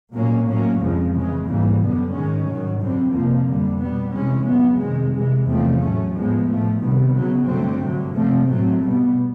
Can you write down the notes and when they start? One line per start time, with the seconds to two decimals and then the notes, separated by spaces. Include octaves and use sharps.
0.11 A#2 F#3 A#3 C#4
0.44 A2 F#3 A#3 C#4
0.78 F2 C#3 F3 G#3
1.12 C#3 E3 G#3
1.45 G#2 E3 G3 A#3
1.78 F#2 D3 G3 B3
2.12 G#2 D#3 G#3 C#4
2.45 G#2 D#3 F#3
2.79 F#2 D3 G3 C4
3.12 F2 C3 F3 A#3
3.46 F2 D3 G3
3.79 B2 G3 B3
4.12 C3 E3 G#3 C#4
4.46 F2 C#3 F#3 B3
4.79 F2 C3 D#3 G#3
5.13 C3 E3 G#3
5.46 E2 C3 F3 A3 C4
5.80 A2 F#3 A3 C#4
6.13 A2 F3 G#3 B3
6.47 A2 F3 A3
6.80 C3 D#3 G3 B3
7.14 C#3 F#3 B3
7.48 G2 D3 F#3 A3 C4
7.81 G2 D3 F#3
8.14 C3 F3 A3 C4
8.47 A2 F#3 A3 C4
8.80 B2 G3 B3